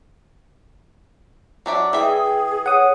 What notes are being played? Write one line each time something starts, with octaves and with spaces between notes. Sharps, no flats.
F#3 D4 D5 E5 D6
E3 G#4 E5 G5
C#5 F#5 D#6